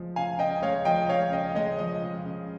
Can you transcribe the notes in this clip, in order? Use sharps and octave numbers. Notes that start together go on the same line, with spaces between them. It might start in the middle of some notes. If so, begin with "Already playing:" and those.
Already playing: C#3 F3 G#3
C#3 F5 G#5
C#3 D#5 G5
G#3 C#5 F5
F3 D#5 G5
C#3 C#5 F5
C#3 D#5
G#3 D#5
F3 D#5
C#3
C#3